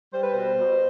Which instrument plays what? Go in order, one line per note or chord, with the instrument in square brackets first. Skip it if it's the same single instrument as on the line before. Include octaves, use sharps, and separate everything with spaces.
[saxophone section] G3 C5
B4
B2 C5
B2